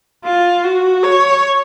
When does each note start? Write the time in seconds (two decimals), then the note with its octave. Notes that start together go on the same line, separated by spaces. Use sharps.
0.25 F4
0.64 F#4
1.04 C#5